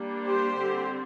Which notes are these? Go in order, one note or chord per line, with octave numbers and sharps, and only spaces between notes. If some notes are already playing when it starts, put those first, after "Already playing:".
Already playing: G3 A#3 D4
G4 C5
D3 G3 C4